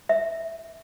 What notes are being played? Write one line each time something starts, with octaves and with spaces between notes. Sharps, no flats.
E5